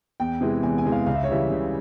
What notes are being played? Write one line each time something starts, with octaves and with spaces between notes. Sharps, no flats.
E2 G5
C3 E3 G#3
E2 G#5
G#5
C3 E3 G#3
F5
C#2 F5
E5
C#5
C#3 E3 G3 E5
C#2